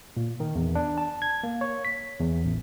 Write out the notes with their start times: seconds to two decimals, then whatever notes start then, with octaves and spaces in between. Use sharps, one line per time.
0.17 A#2
0.40 D#3
0.55 E2
0.75 D4
0.98 A5
1.22 G#6
1.43 A#3
1.61 C#5
1.85 B6
2.20 E2
2.45 A1